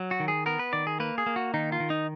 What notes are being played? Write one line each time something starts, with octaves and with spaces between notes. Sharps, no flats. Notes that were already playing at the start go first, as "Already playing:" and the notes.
Already playing: F#3
F#4
D#3
G#4
B3 A#4
B4
D#3 D5
G#4
A#3 B4
G#4
A#3
F#4
D#3 D#4
F4
D#3
D#4